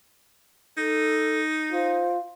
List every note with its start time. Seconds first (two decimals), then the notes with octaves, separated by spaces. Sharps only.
0.77 D#4 A4
1.72 F4 C5